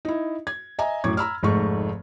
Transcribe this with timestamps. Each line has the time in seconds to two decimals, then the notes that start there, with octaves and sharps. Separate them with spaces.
0.05 D#4 E4
0.47 G#6
0.79 D#5 E5 G#5 A#5
1.04 F#2 A2 C#6 D6 G#6
1.17 A#5 B5 E6 F6
1.43 F1 G#2 A3 C#6